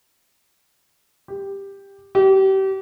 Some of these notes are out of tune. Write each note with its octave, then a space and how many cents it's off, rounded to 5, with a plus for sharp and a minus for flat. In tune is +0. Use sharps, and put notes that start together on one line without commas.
G4 +10
G4 -30